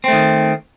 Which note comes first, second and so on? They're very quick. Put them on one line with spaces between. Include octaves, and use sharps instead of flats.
C4 A3 D#3